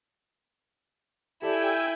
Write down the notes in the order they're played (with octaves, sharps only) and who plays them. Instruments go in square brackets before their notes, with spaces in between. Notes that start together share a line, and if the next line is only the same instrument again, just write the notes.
[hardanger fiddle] E4 [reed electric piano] G4 A4 D5 [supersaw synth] G5 G#5 E6